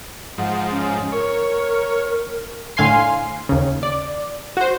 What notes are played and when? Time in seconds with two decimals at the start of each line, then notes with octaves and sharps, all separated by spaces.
0.38 G#2 F3 F#5
0.71 C#4
1.12 A#4 C#5
2.77 A2 D3 F5 G#5 C6 C7
3.49 D#2 C#3
3.83 D5
4.57 F#4 C5